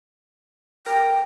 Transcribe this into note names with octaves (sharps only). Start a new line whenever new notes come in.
A#4 G5